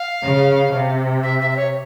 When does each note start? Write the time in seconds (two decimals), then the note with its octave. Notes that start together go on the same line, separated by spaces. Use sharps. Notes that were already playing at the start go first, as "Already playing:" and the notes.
Already playing: F5
0.23 C#3
0.73 C3
1.23 E5
1.41 E5
1.51 E5
1.56 C#5